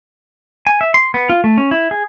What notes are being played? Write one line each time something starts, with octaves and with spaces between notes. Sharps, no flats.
G#5
E5
C6
B3
F4
A3
C#4
E4
G#4